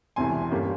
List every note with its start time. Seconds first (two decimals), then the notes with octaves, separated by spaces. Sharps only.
0.16 E1 E2 C3 E3 G#5 C6
0.50 G1 G3 A#3 C#4